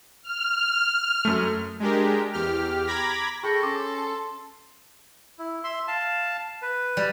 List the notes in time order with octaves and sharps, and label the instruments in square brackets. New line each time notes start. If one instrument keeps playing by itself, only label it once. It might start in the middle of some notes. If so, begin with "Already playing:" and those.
[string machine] F6
[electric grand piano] F#2 A3
[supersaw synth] G#3 D4 G4 A#4
E2 G4 F6
A#5 B5 D6 G#6 A#6 B6
[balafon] G#4 [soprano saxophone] A4 [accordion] G5 B5 C#6 [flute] A#6
[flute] C#4 [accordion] C6 [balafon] D6
[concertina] E4
E5 C6
F5 A5
B4
[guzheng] G3